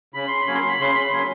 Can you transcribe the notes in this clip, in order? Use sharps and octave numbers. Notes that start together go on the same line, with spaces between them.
C#3 B5
C6
B5
F#3 A#3 C#4
C6
B5
C#3 C6
B5
F#3 A#3 C#4 C6